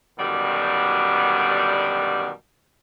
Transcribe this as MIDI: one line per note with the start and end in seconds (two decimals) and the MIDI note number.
0.19 2.31 42
0.19 2.31 47
0.19 2.31 50
0.19 2.31 51
0.19 2.31 55